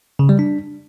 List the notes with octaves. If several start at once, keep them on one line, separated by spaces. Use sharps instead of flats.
C#3
G3
D4